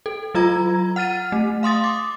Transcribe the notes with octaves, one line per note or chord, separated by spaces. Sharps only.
A4
F#3 F4 A#5 G#6
F#5 F6 A6 D#7
A3
F5 C6 D#6 A6
D6